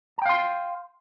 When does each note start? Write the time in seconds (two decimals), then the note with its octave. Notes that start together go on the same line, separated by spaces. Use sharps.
0.18 A5
0.22 G5
0.26 F5
0.29 C6